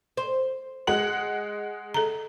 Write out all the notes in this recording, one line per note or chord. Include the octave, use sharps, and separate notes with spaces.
C5
G#3 F#5 F#7
A4 A#5